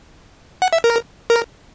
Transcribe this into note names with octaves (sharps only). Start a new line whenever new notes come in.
F#5
E5
A#4
A#4